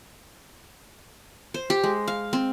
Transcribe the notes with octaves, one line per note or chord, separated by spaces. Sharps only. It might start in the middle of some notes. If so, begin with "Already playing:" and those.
C5
G4
G#3
F5
C4